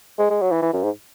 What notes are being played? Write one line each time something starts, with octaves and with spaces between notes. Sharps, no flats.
G#3
G#3
F#3
E3
E3
F#2
G#2